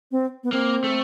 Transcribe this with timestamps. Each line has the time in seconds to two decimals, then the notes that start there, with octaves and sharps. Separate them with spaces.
0.12 C4
0.44 B3
0.53 A#3 C4
0.84 A3